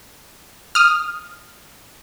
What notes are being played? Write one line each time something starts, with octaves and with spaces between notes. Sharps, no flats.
D#6 F6